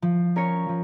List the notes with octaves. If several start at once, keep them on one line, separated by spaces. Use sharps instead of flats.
F3
C#4 A#4 C#5
F3